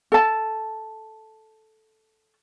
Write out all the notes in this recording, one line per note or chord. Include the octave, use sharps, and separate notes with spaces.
A4 A5